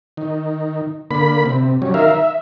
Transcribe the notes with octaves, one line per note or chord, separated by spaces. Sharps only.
D#3
D3 A#3 B5
C3
F#3 G3 C#4
D#3 A#4 E5 F5
E5